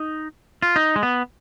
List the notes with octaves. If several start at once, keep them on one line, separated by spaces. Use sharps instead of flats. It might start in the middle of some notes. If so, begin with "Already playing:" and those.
Already playing: D#4
F4
D#4
G#3
B3